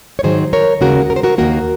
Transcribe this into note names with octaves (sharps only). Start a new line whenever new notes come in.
C#5
G#2 D#3 F#3 G#4 C5
A#4 C#5
D#2 C#3 G#3 F#4 A#4
A#4
C5
F#4 A#4
D#2 D#3 A#3 F#4 A#4